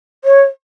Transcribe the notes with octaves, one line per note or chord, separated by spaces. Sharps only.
C#5